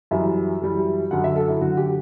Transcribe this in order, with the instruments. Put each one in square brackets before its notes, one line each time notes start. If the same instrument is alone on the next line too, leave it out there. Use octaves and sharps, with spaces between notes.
[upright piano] F#2 E3 G3 E5
F#2 E3 G3
F#2 D3 F#3 F#5
E5
A4
E4
F#2 D3 F#3 F#4
G4